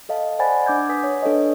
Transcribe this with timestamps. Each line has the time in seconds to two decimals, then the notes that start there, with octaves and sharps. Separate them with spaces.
0.09 A4 D#5 F5 A5
0.39 C5 D5 F#5 G#5 B5 A6
0.66 D4 D6 G6 G#6
0.89 B4 F#5 G#5 D#6 B6
1.04 C#5
1.23 D4 A4 B4 C#5 D#5